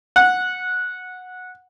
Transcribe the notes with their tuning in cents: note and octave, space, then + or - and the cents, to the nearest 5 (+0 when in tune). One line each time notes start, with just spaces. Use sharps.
F#5 -15